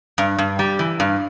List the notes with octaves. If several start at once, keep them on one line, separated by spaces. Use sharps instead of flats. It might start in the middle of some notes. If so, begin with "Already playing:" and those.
G2
G2
G3
E3
G2